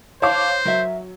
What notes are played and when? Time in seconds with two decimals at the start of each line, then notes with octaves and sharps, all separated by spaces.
0.22 C5 C#5 F5 A5 D6
0.65 F#3 A#4 E5